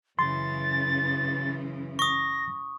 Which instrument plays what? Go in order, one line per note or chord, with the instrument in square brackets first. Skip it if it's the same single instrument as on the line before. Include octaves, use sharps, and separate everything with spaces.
[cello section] F#2 C#3 E3 [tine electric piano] C6 [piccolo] A6
[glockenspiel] C#6 D#6 [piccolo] A#6